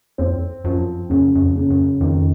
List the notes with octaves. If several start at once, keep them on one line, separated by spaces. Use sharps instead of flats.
F2 C4
F#2 F3
F#2 C#3
F#2
F2
C#3
F#2
F2 D#3